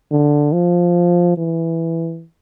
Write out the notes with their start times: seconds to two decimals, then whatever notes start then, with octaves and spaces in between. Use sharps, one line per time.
0.11 D3
0.53 F3
1.37 E3